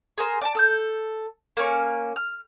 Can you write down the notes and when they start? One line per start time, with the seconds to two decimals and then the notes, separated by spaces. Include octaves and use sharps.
0.18 G#4 A#4 C5
0.41 D5 G#5 A5
0.55 A4 E6 G6
1.57 A#3 C#4 C#6
2.16 F6